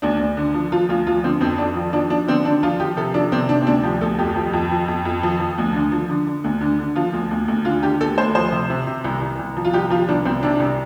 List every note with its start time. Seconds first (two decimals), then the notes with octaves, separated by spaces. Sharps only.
0.02 D2 D4
0.20 D2
0.37 D3
0.54 F3
0.72 F3 F4
0.89 D2 F4
1.07 F3 F4
1.24 D3 C4
1.41 F2 C4
1.58 F2 D4
1.76 F3
1.93 F3 D4
2.10 F3 D4
2.28 D3 C4
2.45 D3 D4
2.63 F3 F4
2.80 F3 G4
2.97 C3 A4
3.14 F3 D4
3.32 C3 C4
3.49 C3 D4
3.62 C4
3.67 D2 D4
3.83 F3 G4
4.01 D2 A4
4.19 F2 G4
4.36 F3
4.53 F2
4.71 F3
4.88 F2
5.05 F2
5.23 F3
5.39 F3
5.58 D2
5.74 D3
5.92 F3
6.10 D3
6.27 D3
6.44 D2
6.61 D3
6.79 D3
6.96 F3 F4
7.13 D2
7.31 D2
7.48 D2
7.65 D3 F4
7.82 D3 G4
8.00 D2 A4
8.18 D2 C5
8.35 F3 C5
8.52 C3
8.70 C3
8.87 C3
9.04 C2
9.21 C2
9.39 C2
9.57 F3
9.65 F4
9.74 C2 G4
9.90 F3 F4
10.08 C2 D4
10.25 C2 C4
10.43 C3 D4
10.60 C2